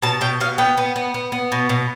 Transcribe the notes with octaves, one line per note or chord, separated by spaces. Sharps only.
B2 A5
B2 G5
B2 F5
B3 G5
B3
B3
B3
B3
B2
B2